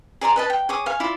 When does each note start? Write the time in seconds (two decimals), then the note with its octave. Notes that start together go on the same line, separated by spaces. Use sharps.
0.21 G#4 D5 A#5 C6
0.36 B4 D#5 A5
0.50 G5
0.69 G#4 C#5 D6 D#6
0.86 F5 G#5 C#6
1.00 E4 F4 D5